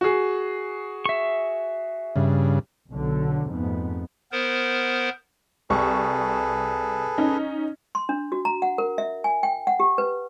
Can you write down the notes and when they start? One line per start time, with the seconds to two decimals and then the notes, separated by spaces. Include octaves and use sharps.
0.01 F#4 G#4
1.06 E5 C#6
2.16 G2 C#3
2.91 B1 D3 F#3
3.50 F2 G#2 A3 B3
4.32 B3 A#4 C5
5.70 C2 G#4 A4 B4 C#6
7.18 C#4 D#4
7.95 C6
8.09 D4
8.32 F#4
8.45 A#5
8.62 F#5
8.78 A#4
8.98 E5
9.24 G#5
9.43 G5
9.67 F#5
9.80 G4
9.98 B4